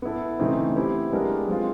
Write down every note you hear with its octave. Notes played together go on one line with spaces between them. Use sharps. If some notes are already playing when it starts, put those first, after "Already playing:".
B3 E4 A4
C#3 E3 A3 C4 D#4
B3 E4 G4 C5
G#3 B3 D4 G4 A#4
G#3 C4 F4